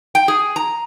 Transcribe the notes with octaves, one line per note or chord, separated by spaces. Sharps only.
G5
G#4
A#5